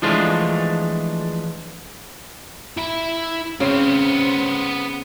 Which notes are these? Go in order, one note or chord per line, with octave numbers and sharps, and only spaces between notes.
E3 F3 G#3 A3 D4 F4
E4 B5
C#3 B3 C4